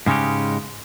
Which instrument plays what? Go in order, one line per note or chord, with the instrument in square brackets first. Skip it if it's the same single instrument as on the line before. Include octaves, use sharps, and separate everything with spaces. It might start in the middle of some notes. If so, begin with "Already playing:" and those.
[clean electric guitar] G#2 C#3 G#3 C#4 G4